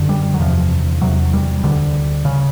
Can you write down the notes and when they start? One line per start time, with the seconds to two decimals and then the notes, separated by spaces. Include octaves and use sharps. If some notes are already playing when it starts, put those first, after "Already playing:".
Already playing: F#2 D3
0.09 G3
0.34 F#3
0.40 E2 C3 F3
1.01 E2 C3 F#3
1.33 G3
1.63 D2 D3 G3
2.25 C#3